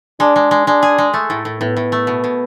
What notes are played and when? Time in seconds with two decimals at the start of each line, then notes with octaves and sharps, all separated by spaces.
0.20 G#3 D4
0.36 G#3
0.51 G#3
0.67 G#3 D4
0.83 G#4
0.98 G#3
1.14 A3
1.30 A2
1.45 A2
1.60 A2 B3
1.77 A2
1.92 A3
2.07 B2
2.24 B2